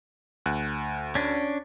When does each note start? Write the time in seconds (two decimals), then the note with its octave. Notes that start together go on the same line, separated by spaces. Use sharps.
0.46 D2 F#6
1.15 C#4 D4